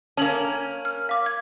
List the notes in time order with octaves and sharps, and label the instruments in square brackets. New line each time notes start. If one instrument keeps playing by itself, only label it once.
[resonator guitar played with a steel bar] A#3 C#4 [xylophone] A5 F#7
[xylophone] F6
F5 D6
G#6